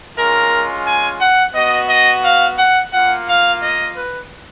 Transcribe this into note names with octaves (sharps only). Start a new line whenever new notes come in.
G#3 C#4 F4 A#4
G#5
F#5
B3 F#4 D#5
D#5
F5
F#5
A#3 F4 F#5
F5
D#5
B4